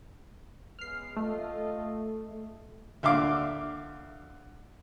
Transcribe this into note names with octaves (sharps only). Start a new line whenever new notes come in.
C#3 G#3 B3 F6 C7
A3 F4 D#5
D2 E5 F5 D6